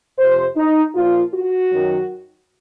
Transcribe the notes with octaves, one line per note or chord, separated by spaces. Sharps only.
F2 C3 F3 C5
D#4
A#2 F3 F4
F#4
F#2 D#3 F#3